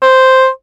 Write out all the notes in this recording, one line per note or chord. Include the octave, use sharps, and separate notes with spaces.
C5